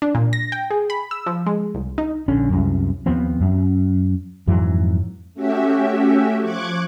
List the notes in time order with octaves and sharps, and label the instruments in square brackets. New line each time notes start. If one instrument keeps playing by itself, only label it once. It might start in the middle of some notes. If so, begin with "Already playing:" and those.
[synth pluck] D4
A#2
A#6
G5
G#4
B5
E6
F3
G#3
C2
D#4
[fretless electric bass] A#1 D3 C#4
C2 F#2
D#2 F3 B3 C4
F#2
F2 G#2 E3 F#3
[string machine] A3 C#4 F#4 G4 E5
F3 C#6 D6 F#6 G#6